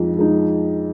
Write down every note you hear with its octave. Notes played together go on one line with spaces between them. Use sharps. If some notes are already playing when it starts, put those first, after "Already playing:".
Already playing: F2 F3 G#3 D#4
F3 G#3 D#4